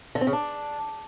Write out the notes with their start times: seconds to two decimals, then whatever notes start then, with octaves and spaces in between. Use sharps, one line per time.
0.15 D3
0.21 C4
0.27 C#3
0.33 D4